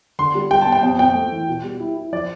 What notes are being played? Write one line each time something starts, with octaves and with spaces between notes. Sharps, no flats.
D3 C6
G3
G3 G5
A5
B3
G5
F2
F2 G5
A3
E3
B2
G3
E4
E4
F3 D5